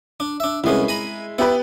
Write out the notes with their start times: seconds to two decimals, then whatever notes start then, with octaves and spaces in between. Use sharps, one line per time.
0.20 D4
0.40 D4 E5
0.64 C2 G#3 B3 C#4 E4
0.88 G#5 A#5 B5
1.38 B3 E4 G4 B4